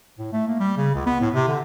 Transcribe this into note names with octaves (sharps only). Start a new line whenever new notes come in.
A2
A3
A#3
G3
C#3
C#2
B3
A2
C3
D3